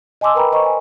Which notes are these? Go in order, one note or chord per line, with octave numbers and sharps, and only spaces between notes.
D#5 G#5 A5 C6 D6 E6
A#4 B4 G5 A#5 B5
C5 D#5 A#5 C#6
G#5